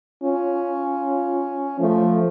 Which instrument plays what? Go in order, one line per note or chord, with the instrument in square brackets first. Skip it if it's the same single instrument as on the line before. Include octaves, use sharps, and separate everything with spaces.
[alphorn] C#4 [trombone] F4
[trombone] F3 [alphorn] A3